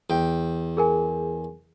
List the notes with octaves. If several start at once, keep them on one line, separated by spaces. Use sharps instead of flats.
E2 G5
G#4 A#4 G#5